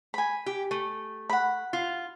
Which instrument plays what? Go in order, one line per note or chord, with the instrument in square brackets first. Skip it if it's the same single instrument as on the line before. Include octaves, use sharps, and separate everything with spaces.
[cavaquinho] G#5 B5
[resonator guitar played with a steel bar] G4
A3
[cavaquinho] F#5 B5
[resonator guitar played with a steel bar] F4